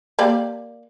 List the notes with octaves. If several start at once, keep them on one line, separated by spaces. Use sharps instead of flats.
A#3 G4 D5